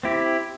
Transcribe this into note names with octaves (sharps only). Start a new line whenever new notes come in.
C4 E4 G4